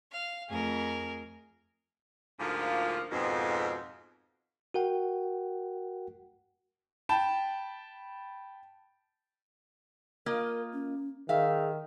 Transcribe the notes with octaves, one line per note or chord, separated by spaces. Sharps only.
F5
F2 A3 G#4 A#4
D2 G#2 D3 F3 A#3 F4
F2 G#2 B2
F#4 A#4 F#5 G5
G5 A5 B5
A#3 F4 A#4 D#5
C#4
D#3 G#4 E5 F5